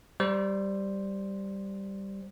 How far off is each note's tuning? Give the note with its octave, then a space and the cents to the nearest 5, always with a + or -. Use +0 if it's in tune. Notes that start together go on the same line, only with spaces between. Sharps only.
G3 +0 C5 +0